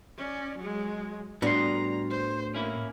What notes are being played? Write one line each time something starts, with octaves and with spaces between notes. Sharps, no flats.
C#4 D5
F#3 G#3
A2 G3 B3 D4 F#4 A#5 C6
C5
A#3 C#4 E4